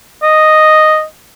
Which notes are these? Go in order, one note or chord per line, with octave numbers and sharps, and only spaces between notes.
D#5